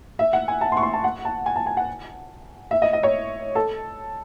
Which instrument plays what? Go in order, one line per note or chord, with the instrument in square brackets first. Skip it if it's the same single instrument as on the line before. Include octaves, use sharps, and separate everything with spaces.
[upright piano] E5
F#5
G#5
A5
C6
C#6
C6
A5
F#5
A5
G#5
A5
G#5
F#5
E5
D#5
D#5
C#5
A4